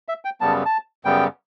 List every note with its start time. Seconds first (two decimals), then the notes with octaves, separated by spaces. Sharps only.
0.09 E5
0.25 G5
0.41 F#2 C#3 G3 B3 A5
0.65 A5
1.05 F#2 C#3 G3 B3 G5